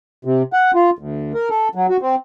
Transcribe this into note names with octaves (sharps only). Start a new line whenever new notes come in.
C3
F#5
F4
D2
A#4
A4
F#3
F#4
C4